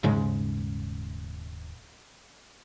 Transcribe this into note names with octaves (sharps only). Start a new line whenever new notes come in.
D#1 G#2 C#3 G#3